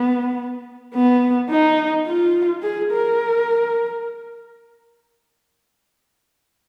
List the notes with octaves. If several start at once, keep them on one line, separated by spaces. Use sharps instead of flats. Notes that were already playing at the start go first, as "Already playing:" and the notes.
Already playing: B3
B3
D#4
F4
G#4
A#4